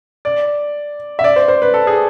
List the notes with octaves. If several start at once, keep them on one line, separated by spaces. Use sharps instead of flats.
D5
E5
D5
C5
C5
B4
A4
G#4